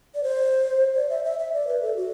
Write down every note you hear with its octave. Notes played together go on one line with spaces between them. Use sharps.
D5
C5
D5
E5
E5
E5
D5
B4
A4
F#4